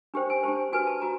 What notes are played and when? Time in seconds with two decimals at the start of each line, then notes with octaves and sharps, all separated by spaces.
0.14 D4 G4 C5 G5
0.30 G#5
0.43 D4 G4 C5 A5
0.72 F#4 B4 G#5
0.87 A5
1.02 F#4 A#5